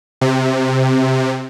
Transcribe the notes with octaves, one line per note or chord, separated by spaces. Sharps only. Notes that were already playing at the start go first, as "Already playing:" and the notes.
C3